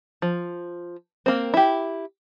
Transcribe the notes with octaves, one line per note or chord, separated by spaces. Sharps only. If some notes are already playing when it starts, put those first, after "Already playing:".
F3
A#3 C4
E4 G4